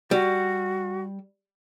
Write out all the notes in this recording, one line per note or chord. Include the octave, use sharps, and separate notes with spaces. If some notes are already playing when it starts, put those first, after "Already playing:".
G3 F#4